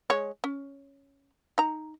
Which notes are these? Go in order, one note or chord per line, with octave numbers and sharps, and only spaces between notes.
G#3 C#5
C#4
D#4 A#5